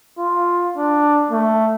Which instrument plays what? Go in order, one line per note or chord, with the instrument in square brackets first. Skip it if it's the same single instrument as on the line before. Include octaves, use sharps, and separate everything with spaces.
[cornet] F4
D4
A3